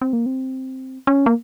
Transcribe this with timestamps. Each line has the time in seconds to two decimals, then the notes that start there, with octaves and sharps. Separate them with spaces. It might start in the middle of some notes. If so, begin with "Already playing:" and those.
0.02 C4
0.13 A#3
0.26 C4
1.07 C#4
1.26 A#3